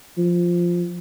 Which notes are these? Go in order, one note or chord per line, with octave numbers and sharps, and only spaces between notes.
F3